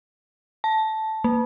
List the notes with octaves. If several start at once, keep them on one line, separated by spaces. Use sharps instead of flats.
A5
A#3